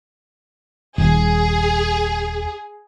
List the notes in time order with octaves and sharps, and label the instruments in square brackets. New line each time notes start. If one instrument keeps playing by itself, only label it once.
[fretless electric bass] D#1 [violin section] G#4